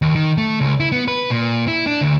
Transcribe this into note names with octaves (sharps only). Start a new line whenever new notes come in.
D#2
D#3
A3
C#2
E4
B3
B4
A#2
E4
D4
D2